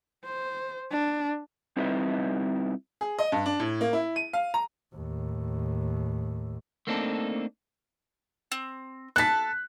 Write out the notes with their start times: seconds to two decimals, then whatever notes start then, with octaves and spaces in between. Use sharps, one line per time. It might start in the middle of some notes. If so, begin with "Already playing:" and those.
0.25 C5
0.91 D4
1.77 G3 C4 D#4 E4 B4 D#5
3.01 G#4
3.19 D#5
3.32 G2
3.46 D4
3.60 A2
3.81 A#3
3.93 E4
4.16 D#7
4.33 F5
4.54 A#5
4.95 D#2 A2
6.87 A3 A#3 C4 D4 D#4 A4
8.52 C4
9.16 A4 A5 F#6 B6